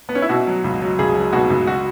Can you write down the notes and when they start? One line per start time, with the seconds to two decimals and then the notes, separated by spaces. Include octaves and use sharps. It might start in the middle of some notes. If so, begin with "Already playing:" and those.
0.09 B3
0.15 C#4
0.22 E4
0.29 B2 F#4
0.47 F#3
0.64 C#2
0.82 F#3
0.99 C#2 G#4
1.15 F#3
1.33 B2 F#4
1.50 C#2
1.67 F#4